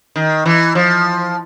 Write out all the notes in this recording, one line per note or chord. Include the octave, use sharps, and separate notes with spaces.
D#3
E3
F3